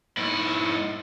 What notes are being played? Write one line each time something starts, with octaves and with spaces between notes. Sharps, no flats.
G#2 E4